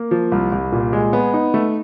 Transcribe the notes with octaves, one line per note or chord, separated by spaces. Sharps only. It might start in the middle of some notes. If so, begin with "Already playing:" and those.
Already playing: A#3
F3
C2
C2
A#2
G#3
B3
D#4
A3